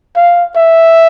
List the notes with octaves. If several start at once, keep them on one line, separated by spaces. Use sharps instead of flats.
F5
E5